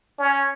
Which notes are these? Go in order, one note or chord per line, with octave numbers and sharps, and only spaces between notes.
C#4